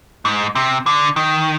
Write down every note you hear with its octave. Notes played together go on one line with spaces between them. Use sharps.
G#2
C3
D3
D#3